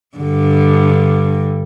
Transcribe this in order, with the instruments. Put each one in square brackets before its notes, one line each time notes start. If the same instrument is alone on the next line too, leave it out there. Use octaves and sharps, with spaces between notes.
[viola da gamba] G2 D3